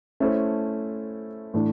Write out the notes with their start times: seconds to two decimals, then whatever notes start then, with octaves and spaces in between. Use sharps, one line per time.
0.20 A3 C#4 E4 A4 C5
1.54 A2 E3 A3 D4